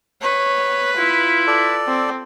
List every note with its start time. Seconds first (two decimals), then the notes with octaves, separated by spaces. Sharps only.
0.22 B4 C#5
0.97 E4 F4
1.47 A4 D5
1.87 C4